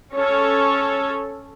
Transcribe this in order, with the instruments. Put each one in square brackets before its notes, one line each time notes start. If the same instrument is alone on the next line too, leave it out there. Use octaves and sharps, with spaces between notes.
[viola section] C#4 A4 C#5